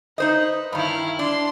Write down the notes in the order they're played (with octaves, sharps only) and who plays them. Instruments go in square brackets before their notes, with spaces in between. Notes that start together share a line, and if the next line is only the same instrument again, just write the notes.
[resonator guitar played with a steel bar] D#4 C5 D#5 [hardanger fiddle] B4
[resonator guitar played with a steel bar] G2 D#3 [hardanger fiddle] E4 F5
[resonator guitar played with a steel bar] D4 [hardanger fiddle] C6